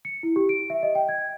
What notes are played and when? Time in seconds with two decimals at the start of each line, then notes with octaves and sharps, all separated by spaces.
0.05 C#7
0.23 E4
0.36 G4
0.49 D7
0.70 E5
0.83 D#5
0.95 G5
1.09 G#6